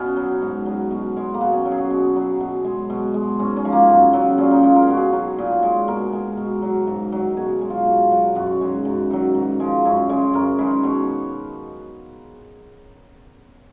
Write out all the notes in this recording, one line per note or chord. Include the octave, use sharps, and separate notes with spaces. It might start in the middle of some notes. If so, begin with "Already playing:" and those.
Already playing: B2 B3 C#4
F#3
G#2
F#3
B2
G#3
A#3
B2 B3
C#4
F#3
G#4
F#4
B2
F#3
B2
G#3
B2
G#3
G#2 C#4
C#4
F3 G#3
A#3
F#2 B3
C#3 F#3
A#2 C#4
D#4
G#3 F4
A#4
G#4
B2 F#4
G#4
F#3
A#2
G#3
B2 A#4
G#3
B2
F#3
G#2
D#3 F#3
B2 G#4
G#3
F4
B2
F#3
F#2 F#4
D#3 G#3
F#2
D#3 F#3
G#2
F3 G#3
F#2 G#4
C#3 G#3
F#2 A#4
D#3 G#3 B4
B2 C#5